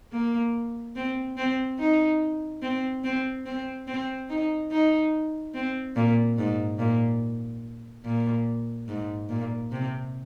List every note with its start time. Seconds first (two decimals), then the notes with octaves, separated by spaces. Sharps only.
0.12 A#3
0.96 C4
1.37 C4
1.79 D#4
2.62 C4
3.04 C4
3.46 C4
3.87 C4
4.29 D#4
4.71 D#4
5.54 C4
5.96 A#2
6.37 G#2
6.79 A#2
8.05 A#2
8.88 G#2
9.29 A#2
9.72 C3